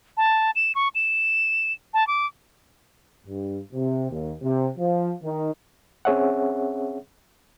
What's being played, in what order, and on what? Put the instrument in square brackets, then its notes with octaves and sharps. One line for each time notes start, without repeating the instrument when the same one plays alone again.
[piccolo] A5
E7
C#6
E7
A5
D6
[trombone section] G2
C3
D#2
C3
F3
D#3
[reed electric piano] C4 C#4 G#4 C#5 E5 F#5